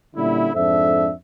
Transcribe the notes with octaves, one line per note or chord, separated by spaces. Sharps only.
A#2 D3 G3 C#4 E4
F2 G#2 D4 A4 C5 E5